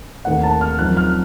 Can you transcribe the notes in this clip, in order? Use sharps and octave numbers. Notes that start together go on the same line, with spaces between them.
D#2 D#3 A3 C4 F#5
A5
F6
F#2 F3 C4 D#4 F#6
F6